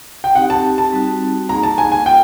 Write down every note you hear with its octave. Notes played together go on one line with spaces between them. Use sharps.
G5
C4 D#4 G4 F#5
A5
A5
G3 C4 D#4 F#4
A#3 D#4 G#4 A#5
A5
G#5
G#5
F4 A4 G5